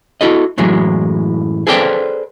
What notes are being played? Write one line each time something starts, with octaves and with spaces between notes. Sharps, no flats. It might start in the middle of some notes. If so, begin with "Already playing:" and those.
E4 F#4 A4 D#5
F#2 A2 E3 F#3 G#3
G#4 A4 B4 C5 D5 G5